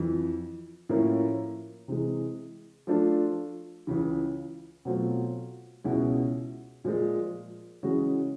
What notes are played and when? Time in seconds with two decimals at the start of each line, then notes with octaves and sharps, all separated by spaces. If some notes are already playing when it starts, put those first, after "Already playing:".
Already playing: F2 E3
0.89 A2 F3 A#3 C#4 E4
1.88 C3 E3 G#3
2.87 F3 A3 D4 F4 A4
3.87 C#2 C#3 E3
4.85 B2 F#3 A3 C4 F4
5.84 C#2 B2 G#3 C#4 E4
6.84 A#2 F3 G#3
7.83 C#3 E3 G#3 C#4 F#4